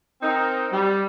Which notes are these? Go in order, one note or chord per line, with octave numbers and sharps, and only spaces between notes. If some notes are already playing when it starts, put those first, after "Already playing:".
C4 D#4 A#4
G3